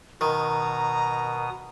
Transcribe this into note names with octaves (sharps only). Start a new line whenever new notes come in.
B2 D#3 A#5 D#6